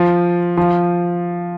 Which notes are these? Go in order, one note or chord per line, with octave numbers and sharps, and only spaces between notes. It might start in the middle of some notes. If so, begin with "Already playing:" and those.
Already playing: F3
F3